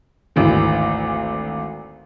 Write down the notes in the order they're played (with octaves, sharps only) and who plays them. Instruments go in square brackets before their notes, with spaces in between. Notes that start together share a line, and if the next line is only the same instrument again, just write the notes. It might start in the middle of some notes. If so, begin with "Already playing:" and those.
[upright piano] G#1 D2 E3